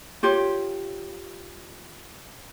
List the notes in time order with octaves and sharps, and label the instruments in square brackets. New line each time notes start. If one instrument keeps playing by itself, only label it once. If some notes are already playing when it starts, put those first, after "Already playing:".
[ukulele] F4 G4 C#5